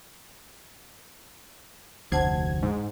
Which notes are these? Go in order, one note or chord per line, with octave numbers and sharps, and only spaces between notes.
F1 D2 C5 F#5 A5 G#6
G#2